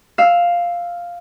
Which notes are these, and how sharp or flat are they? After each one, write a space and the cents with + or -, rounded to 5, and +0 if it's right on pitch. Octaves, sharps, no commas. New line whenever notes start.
F5 +0 E6 +0